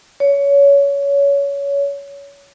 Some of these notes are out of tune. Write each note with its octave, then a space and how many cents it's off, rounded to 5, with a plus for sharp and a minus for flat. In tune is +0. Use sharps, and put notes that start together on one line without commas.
C#5 +25